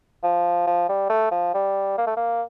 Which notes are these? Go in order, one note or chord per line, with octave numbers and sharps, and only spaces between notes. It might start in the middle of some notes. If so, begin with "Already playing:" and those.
F3
F3
G3
A3
F3
G3
A#3
A3
A#3